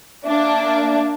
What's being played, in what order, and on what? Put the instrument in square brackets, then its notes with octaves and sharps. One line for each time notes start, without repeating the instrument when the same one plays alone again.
[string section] A#3 D4 [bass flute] E5